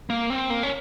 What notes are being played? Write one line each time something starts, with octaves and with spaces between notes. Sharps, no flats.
A#3
C4
A#3
C#4